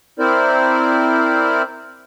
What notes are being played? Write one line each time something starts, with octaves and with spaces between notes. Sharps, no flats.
C4 E4 A#4 C5 D5